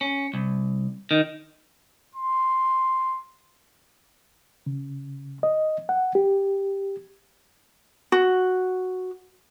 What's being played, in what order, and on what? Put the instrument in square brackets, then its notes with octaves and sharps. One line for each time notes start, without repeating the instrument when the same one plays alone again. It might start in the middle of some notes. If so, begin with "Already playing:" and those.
[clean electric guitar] C#4
C2
D#3
[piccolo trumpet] C6
[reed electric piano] C#3
D#5
F#5
G4
[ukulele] F#4